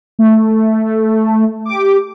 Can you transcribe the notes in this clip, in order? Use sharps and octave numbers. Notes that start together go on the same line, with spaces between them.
A3
G4 D6